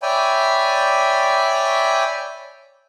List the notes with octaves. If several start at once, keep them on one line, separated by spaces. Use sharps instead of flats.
C#5 D5 E5 G5 G#5 B5